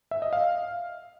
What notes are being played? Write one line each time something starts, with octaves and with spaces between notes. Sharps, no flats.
E5
D#5
F5